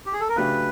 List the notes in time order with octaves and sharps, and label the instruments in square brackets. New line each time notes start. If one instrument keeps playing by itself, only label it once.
[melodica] G4
G#4
A4
A#4
[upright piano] C#3 F#3 A3 D4 G4 [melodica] B4